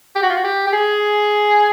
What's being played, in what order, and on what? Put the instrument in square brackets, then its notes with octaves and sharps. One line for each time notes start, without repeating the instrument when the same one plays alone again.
[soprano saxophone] G4
F#4
F4
F#4
G4
G4
G#4